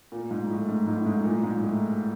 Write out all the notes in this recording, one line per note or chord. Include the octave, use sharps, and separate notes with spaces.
A#2
G#2
A2
G#2
G#2
A2
G#2
A#2
G#2
A2